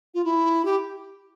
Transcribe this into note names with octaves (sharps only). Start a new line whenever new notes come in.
F4
E4
G4